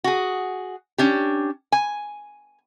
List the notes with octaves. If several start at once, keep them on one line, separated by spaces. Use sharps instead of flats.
F#4 G#4
C#4 D4 G4
G#5